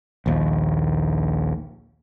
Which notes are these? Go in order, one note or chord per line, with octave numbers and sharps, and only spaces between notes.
A#1 D#2